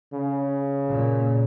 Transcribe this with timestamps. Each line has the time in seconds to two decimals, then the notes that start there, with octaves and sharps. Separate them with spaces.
0.14 C#3
0.89 A#2